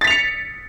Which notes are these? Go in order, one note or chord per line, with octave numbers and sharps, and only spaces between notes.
A6 B6 C#7 F7